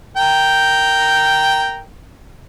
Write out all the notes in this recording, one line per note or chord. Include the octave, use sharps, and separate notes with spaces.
A#4 G5